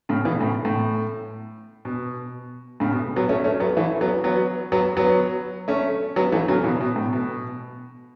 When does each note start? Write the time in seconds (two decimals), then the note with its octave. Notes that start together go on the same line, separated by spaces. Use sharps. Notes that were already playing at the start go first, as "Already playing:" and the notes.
0.09 A2 C#3
0.25 B2 E3
0.41 A2 C#3
0.65 A2
1.85 B2
2.80 A2 C#3
2.92 B2
3.16 F#3 B3
3.29 A3 C#4
3.44 A3 C#4
3.60 F#3 B3
3.77 E3 A3
4.01 F#3 B3
4.24 F#3 B3
4.72 F#3 B3
4.97 F#3 B3
5.68 A3 C#4
6.16 F#3 B3
6.32 E3 A3
6.48 C#3 F#3
6.64 B2 E3
6.81 B2
6.96 A2
7.13 B2